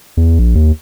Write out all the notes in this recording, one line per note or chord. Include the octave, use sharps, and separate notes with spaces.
E2
A#1
D#2